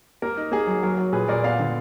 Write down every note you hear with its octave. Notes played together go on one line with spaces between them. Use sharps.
A#3 A#4
D#4
A#3 G#4
F#3
F#3 A#4
F#3
A#2 G#4 B4
A#2 A#4 D5
B3 D5 F5
D3